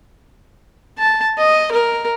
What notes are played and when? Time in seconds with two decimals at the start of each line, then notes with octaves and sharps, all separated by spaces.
0.99 A5
1.38 D#5
1.72 A#4